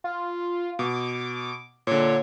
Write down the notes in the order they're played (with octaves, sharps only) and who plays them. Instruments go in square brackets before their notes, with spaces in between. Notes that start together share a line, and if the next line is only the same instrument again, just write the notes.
[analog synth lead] F4
[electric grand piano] B2 [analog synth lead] D6
[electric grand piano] A#2 D3 [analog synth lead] C#5